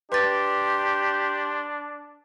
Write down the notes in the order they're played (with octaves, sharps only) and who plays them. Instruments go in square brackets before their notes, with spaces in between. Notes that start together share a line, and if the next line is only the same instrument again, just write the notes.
[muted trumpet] D4 [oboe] G4 [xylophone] B4 A6 [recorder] C6